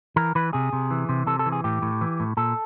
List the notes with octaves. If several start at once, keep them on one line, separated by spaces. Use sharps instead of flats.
E3 A#4
E3 B4
C3 G#4
C3
E3
C3
C3 A4
A4
E3
G#4
A2 G4
A2
E3
A2
A#2 A4